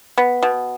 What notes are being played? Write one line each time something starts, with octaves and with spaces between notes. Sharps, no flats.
B3
B2